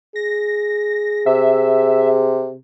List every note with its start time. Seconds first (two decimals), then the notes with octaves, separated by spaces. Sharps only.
0.16 G#4 A#6
1.26 C3 E5